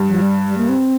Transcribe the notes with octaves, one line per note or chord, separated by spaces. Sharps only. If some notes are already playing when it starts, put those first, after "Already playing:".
Already playing: G2
F3
G3
G3
A#3
C4